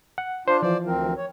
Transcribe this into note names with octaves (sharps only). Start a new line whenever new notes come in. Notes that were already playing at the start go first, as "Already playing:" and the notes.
F#5
D4 F4 C5
E3 F3 C5 D5
D2 C4 A#4
C#5